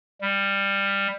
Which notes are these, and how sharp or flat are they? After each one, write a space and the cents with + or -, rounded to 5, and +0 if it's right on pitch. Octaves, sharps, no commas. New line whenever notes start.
G3 +15